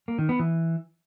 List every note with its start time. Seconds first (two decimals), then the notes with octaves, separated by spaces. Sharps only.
0.08 A#3
0.19 D#3
0.29 B3
0.39 E3